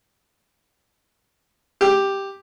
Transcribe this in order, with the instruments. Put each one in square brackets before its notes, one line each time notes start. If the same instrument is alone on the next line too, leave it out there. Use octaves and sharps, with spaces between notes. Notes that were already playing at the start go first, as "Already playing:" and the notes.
[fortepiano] G4